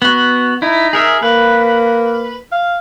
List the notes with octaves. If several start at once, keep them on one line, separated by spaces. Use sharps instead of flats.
B3 F#4
D#4 E4
G#4 A#4 E5
A#3 B4
F5